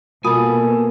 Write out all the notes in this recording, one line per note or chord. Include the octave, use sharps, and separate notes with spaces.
B2 A#3 F4 A4 G#5 D#6